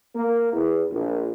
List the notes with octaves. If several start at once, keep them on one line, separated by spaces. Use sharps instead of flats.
A#3
E2
A#1